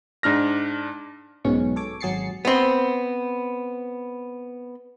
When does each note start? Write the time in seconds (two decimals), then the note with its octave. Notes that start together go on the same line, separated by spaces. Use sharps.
0.23 G#2 D4 F6 A#6
1.45 B1 G#2 B2 C#4 C#6
1.76 A4 C#5 D6
2.01 G#1 F#3 G#4 A6 C7 C#7
2.45 B3 C4